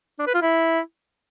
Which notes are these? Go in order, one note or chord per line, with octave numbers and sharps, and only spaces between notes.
D4
B4
F4
E4